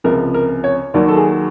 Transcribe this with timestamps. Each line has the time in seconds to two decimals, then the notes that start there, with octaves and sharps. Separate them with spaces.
0.04 C#2 C3 F3 A#4
0.34 A#4
0.64 C#5
0.94 D#2 D#3 F#3 D5
1.08 A4
1.16 G#4